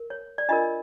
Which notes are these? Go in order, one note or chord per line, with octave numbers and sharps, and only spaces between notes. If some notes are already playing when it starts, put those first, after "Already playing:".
Already playing: A#4
C#5
D5
D4 F4 A#4 D#5